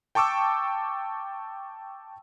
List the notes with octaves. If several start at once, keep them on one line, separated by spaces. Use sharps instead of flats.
G5 A5 C#6 D6 E6